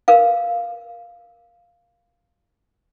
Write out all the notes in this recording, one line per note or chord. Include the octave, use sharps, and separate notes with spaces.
A#4 B4 F5